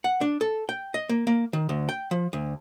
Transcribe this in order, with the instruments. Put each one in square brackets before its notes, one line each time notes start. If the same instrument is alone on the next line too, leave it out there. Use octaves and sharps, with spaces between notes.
[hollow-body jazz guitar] F#5
D4
A4
G5
D#5
A#3
A#3
D#3
D2
G5
F3
D2